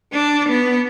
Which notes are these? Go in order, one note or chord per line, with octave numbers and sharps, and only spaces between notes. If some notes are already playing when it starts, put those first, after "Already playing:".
D4
B3